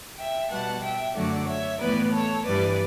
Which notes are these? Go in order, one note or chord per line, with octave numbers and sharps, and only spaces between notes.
E5 G5
B2 G3 B3 F#5 A5
E5 G5
F#2 D3 F#3 A3 D5 F#5
C#5 E5
A2 E3 B3 B4 D5
A4 C#5
G2 E3 G3 B4 D5